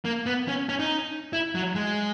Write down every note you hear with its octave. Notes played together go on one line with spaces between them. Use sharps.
A#3
B3
C#4
C#4
D#4
E4
F#3
G#3